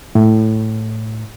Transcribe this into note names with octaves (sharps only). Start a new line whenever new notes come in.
A2